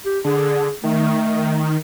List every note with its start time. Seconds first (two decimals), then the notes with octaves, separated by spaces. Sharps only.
0.05 G4
0.25 D3 G#4
0.84 D#3 A3